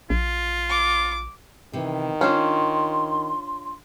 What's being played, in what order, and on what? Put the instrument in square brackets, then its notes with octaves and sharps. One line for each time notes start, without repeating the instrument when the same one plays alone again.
[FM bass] A#1 [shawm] F4
[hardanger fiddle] D6
[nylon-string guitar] C3 E3 [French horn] D#3
[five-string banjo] C#4 [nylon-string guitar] D4 F4 C5 [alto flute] C6